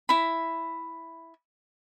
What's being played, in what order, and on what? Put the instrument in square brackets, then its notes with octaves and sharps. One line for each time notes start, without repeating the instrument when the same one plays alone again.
[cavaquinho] E4 B5